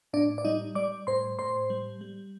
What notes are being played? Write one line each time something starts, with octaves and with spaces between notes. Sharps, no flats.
A2 D4 D5
D5
G3 D#4 D#5
G3 D5 D6
A2 C5 C6
A2 C5 C6
G3
G3